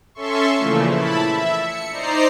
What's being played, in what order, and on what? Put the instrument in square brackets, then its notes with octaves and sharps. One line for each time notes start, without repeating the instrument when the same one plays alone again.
[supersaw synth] C#4 A4 E5 C6 C#6
A#2 C#3 E3 F3 A3
E4 A5 B5
E5
C#7
D#4 C5 D5 A#5 C7